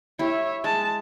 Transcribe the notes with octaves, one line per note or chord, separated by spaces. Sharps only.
E4 G4 C#5 E5
G#3 A5